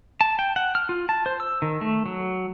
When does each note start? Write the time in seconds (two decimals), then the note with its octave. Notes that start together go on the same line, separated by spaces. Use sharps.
0.21 A5
0.39 G5
0.56 F#5
0.75 F6
0.89 F4
1.09 A5
1.26 C5
1.40 E6
1.62 D#3
1.81 A3
2.06 F#3